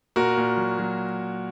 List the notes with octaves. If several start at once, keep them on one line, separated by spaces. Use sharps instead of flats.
A#2 F#4 A#4
A#2
F#3
F#3